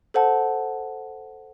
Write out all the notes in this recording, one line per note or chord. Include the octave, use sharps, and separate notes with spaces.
A4 C5 F#5 A5